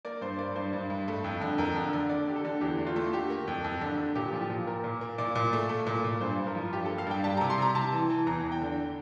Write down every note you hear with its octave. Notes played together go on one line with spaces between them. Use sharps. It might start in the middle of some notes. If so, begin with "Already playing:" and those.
A#3 D5
G2 C5
A#3 D5
G2 C5
G2
G2
A3
F2
D3
F2 A#4
D3
D3
D3 D5
D3 G4
A4
D3
E2 G4
A3
F4
A3
D3 G4
A#3
F2
F2
D3
D3
A#2 G4
F3
G4
A#2
A#3 A#4
A#2
A#3
A#2 D5
A#2
A3
A3
A#2
A#2
G2 C5
G2
A#4
F3
G2 G4
A#3 A4
F5
G2 G5
G3 A5
C3 A#5
C6
C3 A#5
C3 A5
E3
E3
E2 A#5
E2
G5
D3